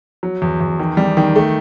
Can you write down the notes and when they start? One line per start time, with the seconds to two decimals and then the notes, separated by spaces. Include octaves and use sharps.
0.23 F#3
0.42 E2
0.61 E2
0.79 D#3
0.97 G3
1.17 D#3
1.36 A3